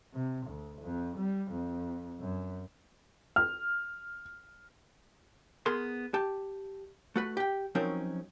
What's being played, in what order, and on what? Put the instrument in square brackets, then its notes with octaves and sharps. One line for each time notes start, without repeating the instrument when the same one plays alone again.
[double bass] C3
D2
F2
G3
F2
F#2
[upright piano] F6
[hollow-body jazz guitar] B3 G#4 A#4 C6
G4 A5
A3 F#4 B4
G4 G5
F3 F#3 C4 C#4 D#4 A#4